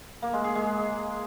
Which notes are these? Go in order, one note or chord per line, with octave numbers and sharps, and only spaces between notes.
A#3
G#3
G#4
G#3